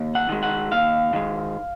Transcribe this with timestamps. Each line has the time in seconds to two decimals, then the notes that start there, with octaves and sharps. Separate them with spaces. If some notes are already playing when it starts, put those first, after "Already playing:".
Already playing: D#2
0.15 F#5
0.29 D#3 G#3
0.43 F#5
0.71 D#2 F5
1.13 D#3 G#3